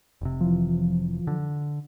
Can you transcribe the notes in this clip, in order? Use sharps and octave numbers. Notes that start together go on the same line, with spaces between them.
F1 C3
E3 F3
D3